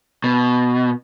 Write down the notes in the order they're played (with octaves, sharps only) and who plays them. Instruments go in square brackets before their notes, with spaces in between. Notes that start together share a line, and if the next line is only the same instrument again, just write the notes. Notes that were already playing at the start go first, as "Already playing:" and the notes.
[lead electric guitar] B2